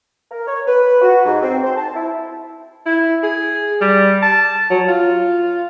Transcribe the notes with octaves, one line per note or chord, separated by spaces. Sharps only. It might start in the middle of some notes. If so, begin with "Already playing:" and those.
A#4
C#5
B4
F#4
G#2
C4
C5
A5
E4
E4
G#4
G3
A5
F#3
F4